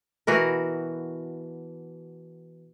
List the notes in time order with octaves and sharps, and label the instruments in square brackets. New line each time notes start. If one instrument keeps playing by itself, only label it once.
[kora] B2 E3 F#4 A#4